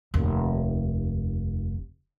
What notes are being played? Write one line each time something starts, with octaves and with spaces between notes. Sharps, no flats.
F1 D#2